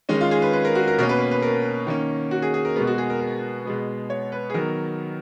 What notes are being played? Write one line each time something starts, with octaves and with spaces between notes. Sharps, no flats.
D#3 G#3 C#4 D#4
F4
G#4
B4
B4
A#4
F#4
A#4
B2 A#3 C#4 A#4
B4
B4
B4
A#4
D#3 A#3 C#4
F#4
G#4
G#4
A#4
B2 G#3 B3 A#4
F#4
G#4
A#4
A#4
B2 G#3 B3
C#5
B4
G#4
D#3 F#3 B3 A#4